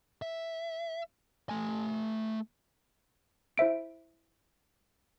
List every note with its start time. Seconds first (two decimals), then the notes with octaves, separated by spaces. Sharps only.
0.22 E5
1.49 A3 G#5
3.58 E4 C5 E5 D7